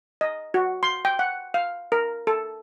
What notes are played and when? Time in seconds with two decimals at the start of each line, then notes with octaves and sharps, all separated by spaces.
0.21 D#5
0.54 F#4
0.83 C6
1.05 G5
1.19 F#5
1.54 F5
1.92 A#4
2.27 A4